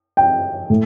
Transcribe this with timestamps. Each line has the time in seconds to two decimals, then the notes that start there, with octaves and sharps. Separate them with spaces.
0.17 G5
0.70 A2